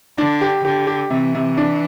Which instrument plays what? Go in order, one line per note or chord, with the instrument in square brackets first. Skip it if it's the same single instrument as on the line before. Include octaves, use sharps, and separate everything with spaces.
[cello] D3 [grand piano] D4
[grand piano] G4
[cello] D3 [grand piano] G4
[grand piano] G4
[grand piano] C3 [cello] E3
[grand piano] C3
D4